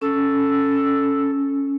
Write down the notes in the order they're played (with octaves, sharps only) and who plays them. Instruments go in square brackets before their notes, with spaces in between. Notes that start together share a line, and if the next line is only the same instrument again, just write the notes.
[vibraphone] C#4 [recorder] A4